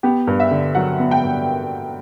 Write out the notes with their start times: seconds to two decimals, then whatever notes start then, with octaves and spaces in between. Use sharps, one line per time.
0.03 B3 G4
0.27 G2
0.40 E5
0.51 D3
0.75 F#3 F#5
0.99 B3
1.11 G5
1.23 G2